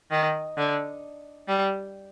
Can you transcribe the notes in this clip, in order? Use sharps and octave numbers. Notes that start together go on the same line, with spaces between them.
D#3
D3
G3